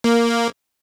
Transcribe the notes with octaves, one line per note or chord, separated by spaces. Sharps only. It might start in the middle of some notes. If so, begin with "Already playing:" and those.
A#3